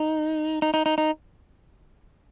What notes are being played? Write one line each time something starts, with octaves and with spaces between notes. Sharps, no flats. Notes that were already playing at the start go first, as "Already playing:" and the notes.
Already playing: D#4
D#4
D#4
D#4
D#4